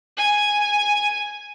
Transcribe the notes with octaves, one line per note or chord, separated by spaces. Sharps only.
G#5